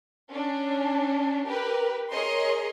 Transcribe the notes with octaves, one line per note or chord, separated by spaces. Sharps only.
C#4 D4
G4 A#4 B4
G#4 A#4 C#5 D#5 C6